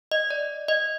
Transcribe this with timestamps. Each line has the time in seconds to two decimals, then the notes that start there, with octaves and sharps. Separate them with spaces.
0.12 D#5
0.30 D5
0.68 D#5